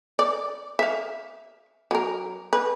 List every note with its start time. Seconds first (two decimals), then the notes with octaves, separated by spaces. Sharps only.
0.19 D5
0.79 E5 F5
1.91 F#3 A#4
2.53 B4